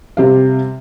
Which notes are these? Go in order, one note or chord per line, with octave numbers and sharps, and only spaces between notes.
C3 G3 F5